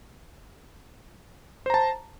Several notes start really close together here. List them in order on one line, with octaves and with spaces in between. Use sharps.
C5 A#5 A5